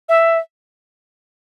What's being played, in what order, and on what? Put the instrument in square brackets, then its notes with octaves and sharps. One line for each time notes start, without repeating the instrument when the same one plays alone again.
[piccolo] E5